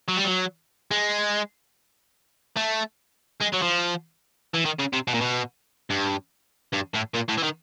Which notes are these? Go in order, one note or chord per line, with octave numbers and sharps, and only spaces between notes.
F#3
G3
F#3
G#3
A3
G#3
F#3
F3
E3
D#3
C#3
C3
B2
A#2
B2
G2
G2
A2
A#2
A2
E3
D#3